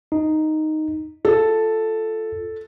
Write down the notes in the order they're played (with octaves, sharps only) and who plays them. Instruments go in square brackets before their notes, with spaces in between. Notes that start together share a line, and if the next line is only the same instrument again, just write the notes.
[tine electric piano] D#4
[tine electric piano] F4 [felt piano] A4